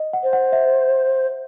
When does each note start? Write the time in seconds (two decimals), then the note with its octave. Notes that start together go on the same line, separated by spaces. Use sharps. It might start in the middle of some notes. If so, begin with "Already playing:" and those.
Already playing: D#5
0.13 F#5
0.23 C5
0.33 F#5
0.53 E5